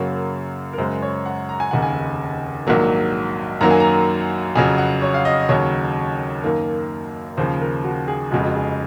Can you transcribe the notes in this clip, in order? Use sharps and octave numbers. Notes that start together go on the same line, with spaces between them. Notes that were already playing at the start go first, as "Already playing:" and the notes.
Already playing: F#2 C#3 F#3 A#3 C#5
A#4
F#2 C#3 G#3 C5
C#5
F#5
A#5
G#5
F1 D#2 C#3 F#5
G#5
A#1 G#2 D#3 F#3 A#3
F#2 D#3 F#3 A#3 A#5
G#5
A#5
F2 C#3 F#3 G#5
F#5
C#5
F5
D#5
D#2 C#3 F#3 C#5
F#2 D#3 A#3
D#2 C#3 F3 C5
A#4
F#4
G#4
F1 F2 C#3 G#3 F#4
F#4
G#4